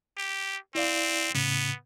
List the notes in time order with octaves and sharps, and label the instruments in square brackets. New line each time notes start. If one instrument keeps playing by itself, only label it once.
[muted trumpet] G4
[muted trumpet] C4 [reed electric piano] E4 D5 F5
[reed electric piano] A2 C#3 [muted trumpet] B3